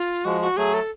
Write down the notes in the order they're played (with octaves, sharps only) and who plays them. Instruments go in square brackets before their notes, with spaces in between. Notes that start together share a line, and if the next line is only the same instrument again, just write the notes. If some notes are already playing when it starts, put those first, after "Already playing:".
Already playing: [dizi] F4
[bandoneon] F3 G#3 [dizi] F#4
[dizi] F#4
[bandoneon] F#3 A3 [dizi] G#4
[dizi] A4